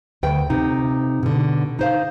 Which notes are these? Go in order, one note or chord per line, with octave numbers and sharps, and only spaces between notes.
D2 B4 G5
C3 D#4
B2 D3
D#4 C5 F5